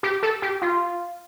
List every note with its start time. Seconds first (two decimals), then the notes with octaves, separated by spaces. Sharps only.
0.03 G4
0.23 A4
0.42 G4
0.62 F4